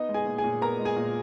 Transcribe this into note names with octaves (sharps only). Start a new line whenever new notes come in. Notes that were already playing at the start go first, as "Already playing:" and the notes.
Already playing: B3 D#4 D#5
G#3
G#4 G#5
A#2
G#4 G#5
A#2
B3 A#4 A#5
G#3
G#4 G#5
A#2